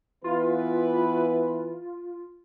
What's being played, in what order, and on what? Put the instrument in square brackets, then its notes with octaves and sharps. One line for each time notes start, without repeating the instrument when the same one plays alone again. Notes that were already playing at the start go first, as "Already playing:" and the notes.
[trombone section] E3 B3 B4 [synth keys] F4